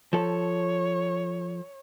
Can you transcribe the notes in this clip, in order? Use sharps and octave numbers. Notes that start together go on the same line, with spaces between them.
F3 A4 C#5